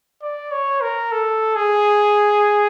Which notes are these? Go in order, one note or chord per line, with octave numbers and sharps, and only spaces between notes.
D5
C#5
A#4
A4
G#4